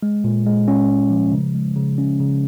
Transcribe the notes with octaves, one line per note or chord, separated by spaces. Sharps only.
G#3
A#2
G#3
C#4
G#3
F3
C#3
G#3
C#3
C#4
C#3